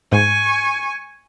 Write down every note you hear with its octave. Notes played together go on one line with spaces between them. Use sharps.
G#2 G#5 C#6